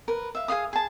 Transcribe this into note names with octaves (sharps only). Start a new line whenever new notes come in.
A#4 B4
E5 F5
G#4 D#5 F5 D#6
G#4 A5